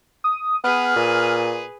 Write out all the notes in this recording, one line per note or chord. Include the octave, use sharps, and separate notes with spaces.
D#6
B3 G#4 B4 F6
A#2